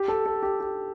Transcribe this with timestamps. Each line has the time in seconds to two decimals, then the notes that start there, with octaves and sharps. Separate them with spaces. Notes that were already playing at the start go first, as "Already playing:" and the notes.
Already playing: G4
0.08 A4
0.26 A4
0.43 G4
0.60 G4